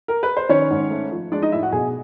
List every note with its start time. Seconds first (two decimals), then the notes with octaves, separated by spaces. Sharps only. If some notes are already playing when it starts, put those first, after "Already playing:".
0.08 A#4
0.23 B4
0.37 C5
0.49 D#3 C#4 C#5
0.71 G#2
0.91 A3
1.11 F3
1.32 G#3 D4 D5
1.42 D#4 D#5
1.52 A2 E4 E5
1.62 F#4 F#5
1.72 B2 G#4 G#5